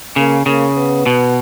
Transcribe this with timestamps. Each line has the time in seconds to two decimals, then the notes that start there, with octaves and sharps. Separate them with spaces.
0.16 C#3 A#3
0.46 C#3 A#3
0.77 B3
1.06 B2